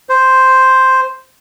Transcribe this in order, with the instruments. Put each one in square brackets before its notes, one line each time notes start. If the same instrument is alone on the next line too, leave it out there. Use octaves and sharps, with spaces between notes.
[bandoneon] C5